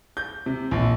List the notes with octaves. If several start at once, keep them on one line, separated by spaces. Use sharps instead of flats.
G6
C3
A#1